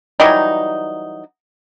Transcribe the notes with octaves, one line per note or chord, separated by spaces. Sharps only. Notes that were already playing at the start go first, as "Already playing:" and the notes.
E3 F#3 G3 D#4